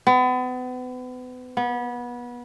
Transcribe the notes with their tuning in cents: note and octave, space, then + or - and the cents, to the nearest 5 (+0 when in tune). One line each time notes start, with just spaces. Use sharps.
B3 +35
B3 -25